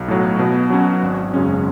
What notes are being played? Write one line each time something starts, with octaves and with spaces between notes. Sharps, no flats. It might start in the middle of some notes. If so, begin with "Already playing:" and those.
Already playing: B1
A2 F#3
B2
F#3 C#4 F#4
G#1
F#2 C#3 G#3 C#4